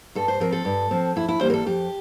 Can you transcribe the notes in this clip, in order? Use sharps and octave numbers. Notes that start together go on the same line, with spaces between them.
G2 A4
C5
F3 C4 A#4
A4
G2
F3 C4
F2 E4
E4
E3 G3 A#3 C5
A#4
A4
F2 G4